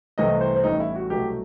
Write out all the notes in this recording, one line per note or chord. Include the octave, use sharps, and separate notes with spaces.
C2 C3 E3 A3 D#5
C5
C4
A1 A2 G3 D#4
E4
F#4
C2 B2 F#3 A3 G4